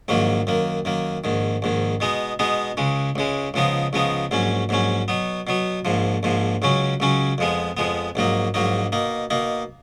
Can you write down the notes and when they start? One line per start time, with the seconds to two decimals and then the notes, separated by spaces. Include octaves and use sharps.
0.08 A#1 G#2 D#3 F#3 A#3
0.47 F#2 D#3 A#3
0.85 F#2 D#3 A#3
1.24 A#1 G#2 D#3
1.62 A#1 G#2 D#3
2.00 B2 G#3 B3 D#4
2.39 B2 G#3 B3 D#4
2.77 C#2 C#3 G#3
3.16 C#2 C#3 G#3
3.54 C#2 C#3 F3 B3 D#4
3.93 C#2 C#3 F3 B3 D#4
4.31 A#1 G#2 F#3 C#4
4.69 A#1 G#2 F#3 C#4
5.08 B2 F#3 B3
5.47 B2 F#3 B3
5.85 A#1 G#2 F3
6.23 A#1 G#2 F3
6.62 C#2 C#3 F#3 C#4
7.00 C#2 C#3 F#3 C#4
7.38 F2 F3 G#3 B3
7.77 F2 F3 G#3 B3
8.15 A#1 G#2 F#3 A#3 D#4
8.54 A#1 G#2 F#3 A#3 D#4
8.92 B2 A#3 D#4
9.30 B2 A#3 D#4